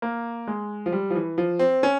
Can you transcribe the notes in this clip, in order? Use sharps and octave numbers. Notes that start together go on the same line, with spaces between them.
A#3
G#3
F3
G3
F3
E3
F3
C4
C#4